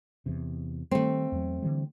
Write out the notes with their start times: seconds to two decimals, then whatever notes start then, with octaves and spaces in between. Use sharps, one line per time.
0.26 E2 C3
0.91 D#3 G3 A3 C4
1.32 E2 F#3
1.62 D3 E3 G3